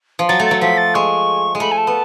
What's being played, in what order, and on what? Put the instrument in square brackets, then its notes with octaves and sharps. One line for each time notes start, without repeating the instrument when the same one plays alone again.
[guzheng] F3
[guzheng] F#3 [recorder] A6
[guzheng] A3
[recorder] A6
[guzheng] F#3
[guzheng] F3 [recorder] B6
[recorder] A6
[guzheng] G#3 [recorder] C#6
[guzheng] G#3
[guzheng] A3 [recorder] B5
[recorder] G#5
A5
[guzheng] B3